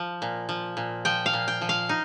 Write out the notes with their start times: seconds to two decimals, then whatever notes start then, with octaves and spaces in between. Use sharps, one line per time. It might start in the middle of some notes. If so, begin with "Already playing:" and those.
Already playing: F3
0.22 A#2
0.49 F3
0.77 A#2
1.05 F3 G5
1.26 F5
1.33 A#2
1.48 G5
1.61 F3
1.69 F5
1.89 D#4